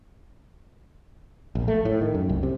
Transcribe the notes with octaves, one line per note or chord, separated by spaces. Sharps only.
A#1
A3
A2
D#3
F#2
C2
C3